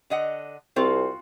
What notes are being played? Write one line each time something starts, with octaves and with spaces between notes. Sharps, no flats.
D3 D#5 F#5
C2 C4 F4 F#4